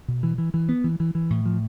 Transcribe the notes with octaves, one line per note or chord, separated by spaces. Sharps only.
B2
E3
E3
E3
B3
E3
E3
E3
A2
F3